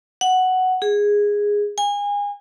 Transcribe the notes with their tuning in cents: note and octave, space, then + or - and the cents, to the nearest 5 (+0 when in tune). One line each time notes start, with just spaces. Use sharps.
F#5 +5
G#4 -10
G#5 -30